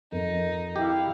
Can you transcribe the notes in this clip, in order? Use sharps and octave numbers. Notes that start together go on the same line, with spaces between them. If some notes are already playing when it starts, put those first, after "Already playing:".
F2 D#4 A#4
E4 G4 F5